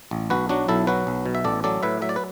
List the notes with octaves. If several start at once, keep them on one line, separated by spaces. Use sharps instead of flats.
A1
B1 F#4 B4
F#3 D4 F#4
B1 E4 A4
F#3 F#4 B4
B1
B2
E5
A1 A4 D5
F#3 A4 D5
A2 B4 E5
F#3 E5
D5
B4